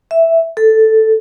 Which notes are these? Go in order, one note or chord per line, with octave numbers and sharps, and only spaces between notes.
E5
A4